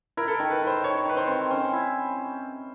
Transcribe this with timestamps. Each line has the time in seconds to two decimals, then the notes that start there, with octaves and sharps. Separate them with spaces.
0.17 E4 A#4
0.28 A4
0.34 A#4
0.39 D#3
0.51 B4
0.62 E4 C5
0.84 D#3 C#5
1.06 D#3 B4
1.17 C5
1.28 C4
1.51 C#4 C5
1.73 E4